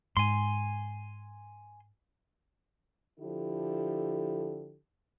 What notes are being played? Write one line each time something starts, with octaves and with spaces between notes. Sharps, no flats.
G#2 G#5 C6
D3 F3 E4 G4 A4